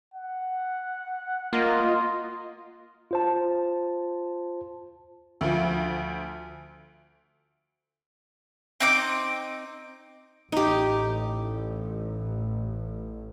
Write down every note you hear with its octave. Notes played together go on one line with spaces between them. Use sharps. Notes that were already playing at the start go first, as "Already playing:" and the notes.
F#5
A#3 F4 D#5
F4 C5 A5
D2 F3
C4 D#4 D6
A1 D#4 G4